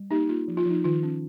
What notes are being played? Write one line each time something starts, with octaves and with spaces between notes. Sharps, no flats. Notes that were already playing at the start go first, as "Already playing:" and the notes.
Already playing: G3
A#3 D#4 G4
A#3 F4
F3
F4
F3 D#4
D#3 F4
C#4